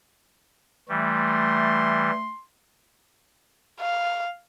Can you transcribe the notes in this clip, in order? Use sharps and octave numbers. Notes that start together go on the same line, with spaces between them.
E3 G3 A3 C6
F5